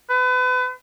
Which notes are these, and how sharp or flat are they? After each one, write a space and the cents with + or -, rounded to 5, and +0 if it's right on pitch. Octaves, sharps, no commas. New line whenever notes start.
B4 +35